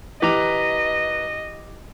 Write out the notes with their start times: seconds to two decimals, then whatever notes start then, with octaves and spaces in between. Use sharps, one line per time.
0.22 E3 G4 B4 D#5 F5 A#5